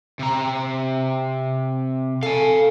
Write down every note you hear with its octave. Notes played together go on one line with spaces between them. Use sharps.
C3 A#5
A4 F5 G#5